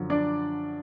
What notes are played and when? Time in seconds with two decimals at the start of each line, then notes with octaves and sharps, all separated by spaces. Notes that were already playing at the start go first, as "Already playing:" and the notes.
Already playing: F#2 D3 F3
0.10 D4 D5